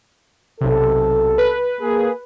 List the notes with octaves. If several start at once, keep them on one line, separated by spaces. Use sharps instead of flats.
B1 C3 A4
B4
A#3 G#4